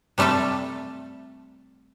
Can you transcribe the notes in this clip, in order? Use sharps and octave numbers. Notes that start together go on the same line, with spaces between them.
C3 G3 A3 A4 E5